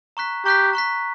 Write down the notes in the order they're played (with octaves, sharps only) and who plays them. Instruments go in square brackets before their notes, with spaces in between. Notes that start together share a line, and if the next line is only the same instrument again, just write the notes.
[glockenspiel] A#5 C#6 F#6 B6
[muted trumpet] G4 [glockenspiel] A#5 C#6 F#6 B6
[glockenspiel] A#5 C#6 F#6 B6